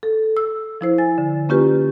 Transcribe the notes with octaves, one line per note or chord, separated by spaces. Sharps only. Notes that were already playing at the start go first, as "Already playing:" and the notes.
A4
E6
F3 E4 C5
G#5 A6
D3
A#3 C#4 F4 G4 B4